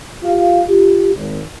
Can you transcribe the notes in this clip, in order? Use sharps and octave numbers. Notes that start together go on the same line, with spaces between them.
F4 G4 F5
F4 G4
G#1